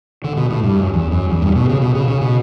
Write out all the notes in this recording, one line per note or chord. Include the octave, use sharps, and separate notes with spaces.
D3
B2
A2
G2
F#2
E2
F#2
E2
G2
B2
C#3
B2
C#3
C#3
B2